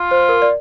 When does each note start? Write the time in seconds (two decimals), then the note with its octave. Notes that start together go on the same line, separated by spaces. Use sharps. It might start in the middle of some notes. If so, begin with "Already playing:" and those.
Already playing: F4
0.11 C5
0.29 A#4
0.42 D5